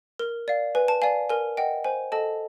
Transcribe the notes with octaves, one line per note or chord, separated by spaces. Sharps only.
A#4
D5 F5
B4 G#5
A5
D5 F5 G#5
A#4 G#5
D#5 F#5 G5
C5 G#5
A4 D#5 F#5 A5